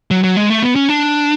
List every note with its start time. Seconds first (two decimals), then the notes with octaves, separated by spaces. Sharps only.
0.11 F#3
0.24 F#3
0.37 G#3
0.50 A3
0.62 B3
0.76 C#4
0.89 D4